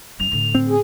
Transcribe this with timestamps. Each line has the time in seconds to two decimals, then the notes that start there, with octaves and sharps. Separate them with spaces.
0.20 F#2 F7
0.32 A2 D3
0.55 C4
0.69 G#4